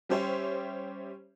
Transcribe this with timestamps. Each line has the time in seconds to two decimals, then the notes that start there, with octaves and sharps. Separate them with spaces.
0.09 G3 C#4 G4 C5 C#5 E5